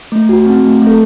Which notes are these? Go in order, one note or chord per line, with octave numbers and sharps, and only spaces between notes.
A3
F#4
C4
A3
A3
A4